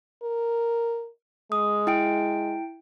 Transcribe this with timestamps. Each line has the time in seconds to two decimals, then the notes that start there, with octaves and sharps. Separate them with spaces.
0.23 A#4
1.52 G#3 D#6
1.87 E4 G5 D7